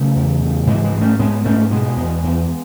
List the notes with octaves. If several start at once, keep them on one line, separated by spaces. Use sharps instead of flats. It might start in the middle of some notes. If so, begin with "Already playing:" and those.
Already playing: C#3 F#3 A3
E2
C#3
G#2 E3 G#3
E3 G#3
G#2
A3 C#4
G#2 G#3 B3
G#2 A3 C#4
B2 G#3 B3
E2
E2